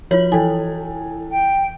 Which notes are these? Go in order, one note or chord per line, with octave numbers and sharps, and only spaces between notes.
F3 F4 F#4 C#5 F#7
E3 E4 A4 G5 G#5
G5